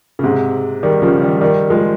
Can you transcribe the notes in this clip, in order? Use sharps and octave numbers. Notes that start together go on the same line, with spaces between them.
C#3
G#2 C3
D#3 G3
C#3 F3
D#3 G3
D#3 G3
F3 G#3